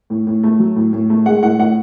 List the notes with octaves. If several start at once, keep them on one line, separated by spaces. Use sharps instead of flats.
A2
A2
A3
F#3
A2
A2
A3
G#3 F#5
A2 F#5
A2 F#5